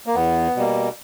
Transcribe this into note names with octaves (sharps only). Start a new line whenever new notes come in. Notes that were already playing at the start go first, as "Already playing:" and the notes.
A#3
E2 B3
B2 G3 A#3